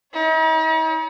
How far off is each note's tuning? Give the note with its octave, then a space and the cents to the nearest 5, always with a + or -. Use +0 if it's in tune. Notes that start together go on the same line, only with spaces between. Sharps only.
D#4 +45 C#5 +40